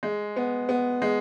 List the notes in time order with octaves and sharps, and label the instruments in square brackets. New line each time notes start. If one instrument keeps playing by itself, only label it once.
[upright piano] G#3
B3
B3
G#3